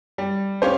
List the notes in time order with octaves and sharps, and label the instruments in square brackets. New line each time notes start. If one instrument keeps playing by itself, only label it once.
[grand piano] G3
C#4 G4 C5 F5